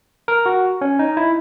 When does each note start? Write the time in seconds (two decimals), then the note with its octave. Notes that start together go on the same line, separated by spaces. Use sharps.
0.28 A#4
0.46 F#4
0.81 C#4
0.99 D#4
1.17 E4